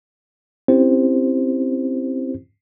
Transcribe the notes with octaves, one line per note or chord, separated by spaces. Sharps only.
C4 C#4 E4 G4 C5